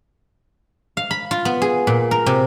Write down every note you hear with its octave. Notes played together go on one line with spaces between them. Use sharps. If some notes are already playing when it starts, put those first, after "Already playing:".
F5
B5
F4
B3
G#4
A#2
A#4
C3